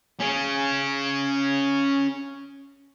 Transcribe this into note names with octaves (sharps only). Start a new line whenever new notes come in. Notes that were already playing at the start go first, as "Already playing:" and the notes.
C#4 G#4